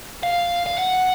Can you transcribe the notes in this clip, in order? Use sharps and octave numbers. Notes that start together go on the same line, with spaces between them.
F5
F5
F#5